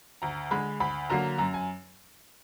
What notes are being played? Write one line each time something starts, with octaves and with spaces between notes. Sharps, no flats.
D2 A#5
D3 G#3 B5
D2 B5
D3 F#3 A#3 A#5
F#2 A#5
G#5